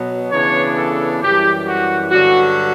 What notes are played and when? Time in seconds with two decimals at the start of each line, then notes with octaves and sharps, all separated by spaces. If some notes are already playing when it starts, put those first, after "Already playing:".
Already playing: B2 F#3 B3
0.32 C#3 E3 B3 D4 C#5
0.77 A4
1.22 F#2 E3 G3 G4
1.67 F#4
2.11 G2 D3 F#3 F#4